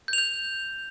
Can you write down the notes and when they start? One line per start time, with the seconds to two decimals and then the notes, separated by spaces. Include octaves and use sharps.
0.08 G6
0.13 F7
0.18 G6